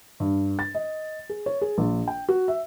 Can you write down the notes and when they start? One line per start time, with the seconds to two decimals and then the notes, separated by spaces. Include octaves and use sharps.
0.20 G2
0.59 A6
0.75 D#5
1.29 G#4
1.46 C#5
1.61 G#4
1.78 A#1
2.08 G5
2.29 F#4
2.48 E5